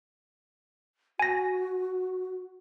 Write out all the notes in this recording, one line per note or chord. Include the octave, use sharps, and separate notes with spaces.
F#4 G#5 A#6